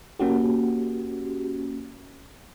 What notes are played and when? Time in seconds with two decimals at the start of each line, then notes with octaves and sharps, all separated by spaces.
0.19 A#3 C#4 F#4 G4